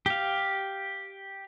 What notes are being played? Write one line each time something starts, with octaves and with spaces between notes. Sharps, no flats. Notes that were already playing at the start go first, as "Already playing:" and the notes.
G4 F5